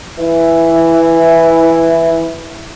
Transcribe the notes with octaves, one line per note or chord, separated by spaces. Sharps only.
E3 E4